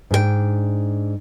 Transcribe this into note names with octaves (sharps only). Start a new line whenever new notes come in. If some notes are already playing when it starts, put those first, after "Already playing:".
G#2 D4 G#4 G5